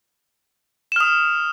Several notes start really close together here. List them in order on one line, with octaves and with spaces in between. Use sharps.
E7 F6 D#6